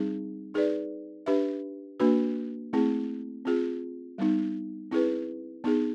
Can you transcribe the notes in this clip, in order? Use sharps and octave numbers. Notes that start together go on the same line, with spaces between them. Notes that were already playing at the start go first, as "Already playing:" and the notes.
Already playing: G3 C4 D#4 G#4
D#4 G#4 B4 D5
D4 G4 B4 E5
A#3 D4 F#4 B4
A3 C4 E4 G#4
C4 F4 G#4
G3 B3 D#4
C4 E4 G#4 B4
B3 D#4 G#4